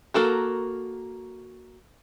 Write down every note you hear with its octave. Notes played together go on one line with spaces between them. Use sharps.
A#3 F#4 A4 A#4